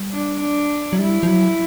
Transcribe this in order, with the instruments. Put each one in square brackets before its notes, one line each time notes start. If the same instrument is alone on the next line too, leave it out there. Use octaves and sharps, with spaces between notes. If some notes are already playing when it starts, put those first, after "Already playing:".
Already playing: [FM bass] G3
[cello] D4
D4
[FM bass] F#3
[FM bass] G3 [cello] E4
[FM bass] F3
F#3